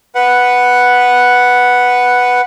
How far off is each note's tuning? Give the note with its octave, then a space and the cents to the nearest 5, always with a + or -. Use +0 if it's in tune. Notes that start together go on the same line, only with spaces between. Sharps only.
B4 +0 F#5 +0